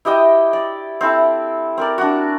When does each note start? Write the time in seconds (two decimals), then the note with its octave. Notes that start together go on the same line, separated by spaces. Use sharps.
0.05 E4 G4 D#5 G5
0.53 D5
1.01 C4 E4 A4
1.78 C4 A#4 D5
1.98 D4 F#4